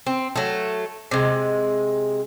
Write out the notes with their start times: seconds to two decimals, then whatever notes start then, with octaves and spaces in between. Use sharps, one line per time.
0.06 C4
0.36 F#3 A3
1.11 C3 G#3